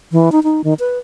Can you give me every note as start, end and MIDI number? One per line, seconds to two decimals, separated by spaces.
0.12 0.32 52
0.32 0.39 63
0.43 0.64 63
0.64 0.74 51
0.79 0.98 71